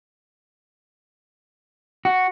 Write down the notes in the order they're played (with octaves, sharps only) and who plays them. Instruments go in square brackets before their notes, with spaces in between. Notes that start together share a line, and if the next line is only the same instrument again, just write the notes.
[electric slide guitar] F#4